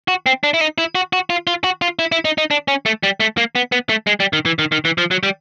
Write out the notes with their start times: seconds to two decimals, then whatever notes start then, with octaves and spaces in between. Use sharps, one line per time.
0.08 F#4
0.26 C4
0.43 D4
0.54 E4
0.61 D#4
0.78 E4
0.95 F#4
1.13 F#4
1.30 F4
1.47 F4
1.64 F#4
1.82 F4
1.99 E4
2.12 E4
2.25 D#4
2.38 D#4
2.51 D4
2.68 C#4
2.86 A3
3.03 G3
3.20 A3
3.38 A#3
3.55 B3
3.72 B3
3.89 A3
4.07 G#3
4.20 G3
4.33 D#3
4.46 E3
4.59 D#3
4.72 D#3
4.85 E3
4.98 F3
5.11 F#3
5.23 G3